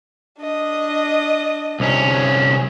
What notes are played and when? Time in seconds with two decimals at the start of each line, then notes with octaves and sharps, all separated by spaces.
0.41 D4 D#5
1.80 C2 C#4